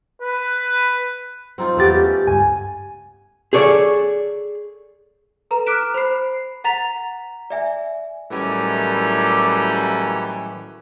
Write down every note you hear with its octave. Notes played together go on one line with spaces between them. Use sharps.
B4
C4 D#4 F4
E2 A3 B3 G4 A6
C#4 G4
C#2 G2 G#5
G#4 A4 C#5 D5
A4 B4 A#5
D6 F6 F#6 B6 D7 E7
C5 B5 C7
F#5 A#5 A6 B6 F7
D5 E5 G#5
A2 D#3 E3 F#3 G3 C#4